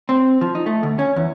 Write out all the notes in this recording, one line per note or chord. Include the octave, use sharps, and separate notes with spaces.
C4
F3
D#4
A3
D2
C#4
E2